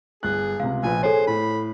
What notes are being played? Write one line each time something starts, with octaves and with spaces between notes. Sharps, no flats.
G1 G#4 F#6
C#2 C3 F5
A#1 A#2 B4 G#5
G#4 A4 C5 C#5 G#5
A2 B5